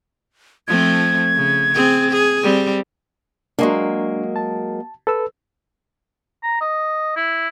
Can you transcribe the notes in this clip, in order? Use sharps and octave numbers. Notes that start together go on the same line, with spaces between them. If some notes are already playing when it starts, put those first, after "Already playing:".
F3 A3 C4 G#6
C#3
C4 G#4
G#4
G3 C4
F#3 G#3 A#3 D4 A#4 C#6
A5
A4 B4 E6
A#5
D#5
E4